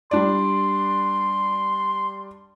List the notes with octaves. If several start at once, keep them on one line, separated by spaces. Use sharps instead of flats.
G3 D4 D5 C6